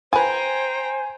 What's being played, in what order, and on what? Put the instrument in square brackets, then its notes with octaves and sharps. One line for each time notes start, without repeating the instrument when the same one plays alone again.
[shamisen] F4 B4 [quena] C5 [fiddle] G5 A#5 [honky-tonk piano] G#5